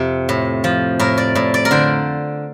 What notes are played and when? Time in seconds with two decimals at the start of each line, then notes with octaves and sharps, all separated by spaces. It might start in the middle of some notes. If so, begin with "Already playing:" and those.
Already playing: F2 C3
0.29 A2
0.64 F3
0.99 A2 A#4
1.18 D5
1.35 A2
1.54 D5
1.65 A#4
1.71 D3 C5